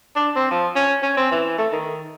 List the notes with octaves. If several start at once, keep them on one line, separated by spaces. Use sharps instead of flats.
D4
C4
F3
C#4
C#4
C4
E3
A3
D#3